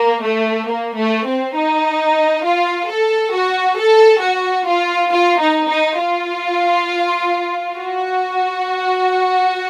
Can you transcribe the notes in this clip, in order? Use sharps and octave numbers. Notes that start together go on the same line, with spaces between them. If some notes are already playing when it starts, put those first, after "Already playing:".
Already playing: A#3
A3
A#3
A3
C4
D#4
F4
A4
F#4
A4
F#4
F4
F4
D#4
D#4
F4
F#4